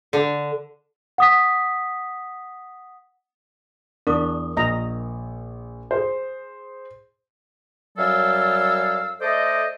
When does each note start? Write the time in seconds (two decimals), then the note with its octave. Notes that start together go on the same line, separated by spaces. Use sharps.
0.13 D3
1.18 F#5 D#6 B6
4.07 E2 D4 A#4 C#6 D#6
4.57 A#1 D#5 A#5
5.91 G#4 C5
7.97 F#2 F#3 G3 A4 F5 E6
9.21 A3 A4 C5 D5 D#5